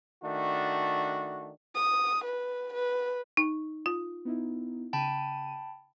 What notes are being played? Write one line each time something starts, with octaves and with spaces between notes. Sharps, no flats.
D#3 A3 D4 F#4
D#6
B4
B4
D#4
F4
B3 D#4 E4
C#3 G5 A5 B5 D#7